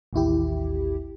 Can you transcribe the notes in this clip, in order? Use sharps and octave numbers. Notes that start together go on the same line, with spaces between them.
A1 D#2 E4 G4